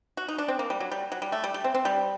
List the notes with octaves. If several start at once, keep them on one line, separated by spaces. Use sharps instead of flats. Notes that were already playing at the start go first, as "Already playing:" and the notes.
F#4
D#4
D4
C4
A#3
G3
F#3
G3
F#3
G3
A3
G3
G3
C4
C4
G3